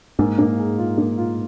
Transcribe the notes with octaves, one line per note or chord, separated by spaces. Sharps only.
G#2 A#3
A#3
G#4
F4
A#3
F4